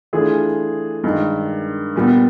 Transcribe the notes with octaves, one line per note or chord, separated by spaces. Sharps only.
E3 A3 D4 F4 G#4
G2 D#3 G#3
A#2 G3 B3